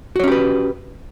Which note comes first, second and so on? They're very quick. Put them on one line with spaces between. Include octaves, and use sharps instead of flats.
F#4 C#5 C#4 G4 B4